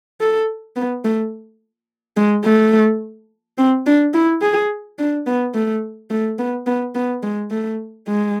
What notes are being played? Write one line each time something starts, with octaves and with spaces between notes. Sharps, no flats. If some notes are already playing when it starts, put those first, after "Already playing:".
A4
B3
A3
G#3
A3
C4
D4
E4
G#4
D4
B3
A3
A3
B3
B3
B3
G#3
A3
G#3